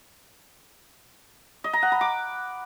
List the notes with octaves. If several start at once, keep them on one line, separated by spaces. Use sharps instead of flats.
D#5
A#5
F#5
B5
D6